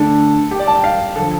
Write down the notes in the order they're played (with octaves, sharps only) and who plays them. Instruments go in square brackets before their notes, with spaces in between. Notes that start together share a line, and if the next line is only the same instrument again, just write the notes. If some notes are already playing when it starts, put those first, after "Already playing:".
Already playing: [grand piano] D3 A3 D4 [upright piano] A4
[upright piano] G4
D5
A5
G5
F5
[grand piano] D3 F3 [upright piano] A4